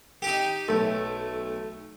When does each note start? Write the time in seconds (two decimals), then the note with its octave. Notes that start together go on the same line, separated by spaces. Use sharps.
0.22 D#4 G4
0.68 B1 A3